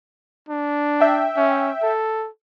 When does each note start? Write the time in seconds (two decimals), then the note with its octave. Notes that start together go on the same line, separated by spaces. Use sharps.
0.49 D4
1.00 E5 G5
1.37 C#4
1.83 A4